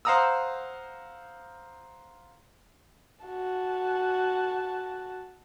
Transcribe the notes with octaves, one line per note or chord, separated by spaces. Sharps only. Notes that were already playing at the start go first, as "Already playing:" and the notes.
C5 F5 F#5 A#5 D#6 E6
F#4 A5